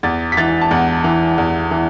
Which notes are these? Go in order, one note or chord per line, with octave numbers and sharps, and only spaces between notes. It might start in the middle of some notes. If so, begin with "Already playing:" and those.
E2 A6
B6
E3 A6
A5
E2 F#5
E3
E2
E3